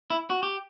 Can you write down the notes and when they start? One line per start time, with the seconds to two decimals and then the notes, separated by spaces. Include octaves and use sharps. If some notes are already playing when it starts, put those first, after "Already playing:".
0.10 E4
0.30 F#4
0.43 G4